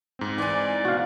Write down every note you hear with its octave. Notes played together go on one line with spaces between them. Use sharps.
G#2 C4
E3 D5 G#5
B2 F#4 F5